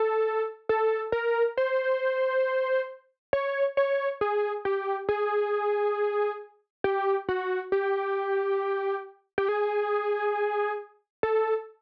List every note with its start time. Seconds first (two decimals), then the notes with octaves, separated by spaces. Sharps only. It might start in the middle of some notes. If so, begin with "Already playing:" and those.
Already playing: A4
0.69 A4
1.12 A#4
1.57 C5
3.33 C#5
3.77 C#5
4.21 G#4
4.65 G4
5.09 G#4
6.84 G4
7.29 F#4
7.72 G4
9.38 G4
9.48 G#4
11.23 A4